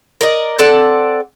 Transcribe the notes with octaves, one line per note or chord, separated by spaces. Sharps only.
A#4 D5 D#5
C4 A4 D5 F#5